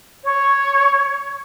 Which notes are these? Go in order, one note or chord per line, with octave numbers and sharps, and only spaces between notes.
C#5